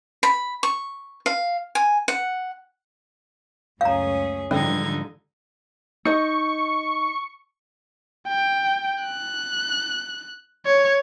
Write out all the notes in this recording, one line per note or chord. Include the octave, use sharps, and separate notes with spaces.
B5
C#6
F5
G#5
F#5
C#2 F#2 A3 C#4 G#4 F5 A#5
G#2 D3 E3 F3 G3 C#4 D#4 G#6
D#4 D#5 C#6
G5
F#6
C#5